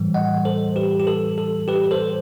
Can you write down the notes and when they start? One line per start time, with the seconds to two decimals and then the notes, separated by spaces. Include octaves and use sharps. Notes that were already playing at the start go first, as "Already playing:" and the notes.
Already playing: A2 E3 G3
0.14 D#5 F#5
0.45 A4 C5
0.76 G4 B4
1.00 G4
1.07 A4
1.38 A4
1.68 G4 B4
1.91 A4 C5